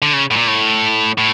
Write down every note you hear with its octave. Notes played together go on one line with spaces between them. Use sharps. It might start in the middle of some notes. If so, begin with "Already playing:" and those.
D3
C#3
A2
A#2
A2
A2